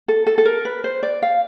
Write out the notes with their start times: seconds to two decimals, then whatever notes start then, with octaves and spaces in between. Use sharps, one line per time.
0.08 A4
0.27 A4
0.38 A4
0.45 A#4
0.65 B4
0.84 C5
1.03 D5
1.22 F5